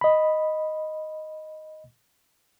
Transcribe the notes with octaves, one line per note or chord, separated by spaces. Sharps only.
D#5 B5